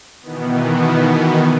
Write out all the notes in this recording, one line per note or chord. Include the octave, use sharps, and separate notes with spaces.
B2 D#3 E3 B3